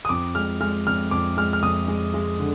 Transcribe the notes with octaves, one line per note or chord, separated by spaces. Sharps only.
D#6
F2 D6
G#3 F6
G#3 F6
F2 F6
F2 D6
G#3 F6
F6
F2 D#6
G#3
G#3
D3